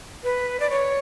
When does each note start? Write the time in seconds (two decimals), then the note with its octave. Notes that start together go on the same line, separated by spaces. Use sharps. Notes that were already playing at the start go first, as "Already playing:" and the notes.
0.24 B4
0.60 D5
0.70 C#5